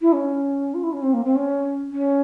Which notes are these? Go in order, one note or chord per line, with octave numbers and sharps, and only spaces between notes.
E4
C#4
F4
E4
C#4
C4
A#3
C4
C#4
C#4